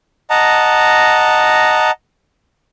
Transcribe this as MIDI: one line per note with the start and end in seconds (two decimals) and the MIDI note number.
0.30 1.91 75
0.30 1.91 78
0.30 1.91 81
0.30 1.91 82